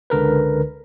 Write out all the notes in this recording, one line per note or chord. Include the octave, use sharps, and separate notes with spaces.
C#2 D3 A#4 B4